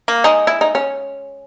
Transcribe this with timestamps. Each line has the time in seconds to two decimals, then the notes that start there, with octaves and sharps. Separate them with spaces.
0.08 A#3
0.24 G#3 D#4
0.47 E4
0.61 D#4
0.75 C#4